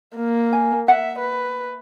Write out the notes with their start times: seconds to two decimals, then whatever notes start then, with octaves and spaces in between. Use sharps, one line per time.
0.16 A#3
0.53 G#5
0.88 E5 F#5
1.19 B4